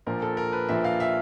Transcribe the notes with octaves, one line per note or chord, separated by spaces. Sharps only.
A#1 A#2 F3 A#4
A4
A#4
B4
A#1 A#2 F3 E5
F5
E5